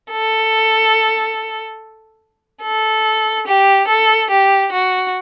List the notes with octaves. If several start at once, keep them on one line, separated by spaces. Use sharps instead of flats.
A4
A4
G4
A4
G4
F#4